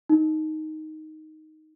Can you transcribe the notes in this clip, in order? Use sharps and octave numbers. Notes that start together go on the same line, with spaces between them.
D#4